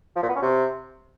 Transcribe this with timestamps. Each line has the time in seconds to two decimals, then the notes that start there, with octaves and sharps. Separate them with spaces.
0.16 F3
0.23 A#2
0.29 B3
0.36 C#4
0.42 C3